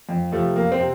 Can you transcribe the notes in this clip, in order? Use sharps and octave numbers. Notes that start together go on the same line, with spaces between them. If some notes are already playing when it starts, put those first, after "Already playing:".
F2
C3 F3 A3
F2 A#3
C4
C3